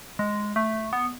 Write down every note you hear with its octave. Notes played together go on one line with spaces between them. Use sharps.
G#3
A3
B3